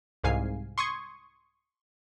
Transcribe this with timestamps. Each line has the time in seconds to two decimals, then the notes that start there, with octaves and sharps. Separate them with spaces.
0.24 C2 G#2 F5 G#5 C7
0.78 C6 C#6 D#6 G#6